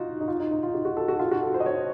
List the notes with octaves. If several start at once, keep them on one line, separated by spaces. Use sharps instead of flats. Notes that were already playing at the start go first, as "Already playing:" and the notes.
Already playing: D#4 F4 F#4
D#4
F4
D#4
D#4
F4
F#4
F#4
A4
F#4
F4
F#4
A4
C5
D#5
C#5